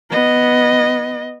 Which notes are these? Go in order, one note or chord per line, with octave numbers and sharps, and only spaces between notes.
B3 D#5